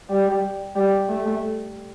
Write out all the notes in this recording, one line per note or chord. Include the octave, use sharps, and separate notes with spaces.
G3
G3
A3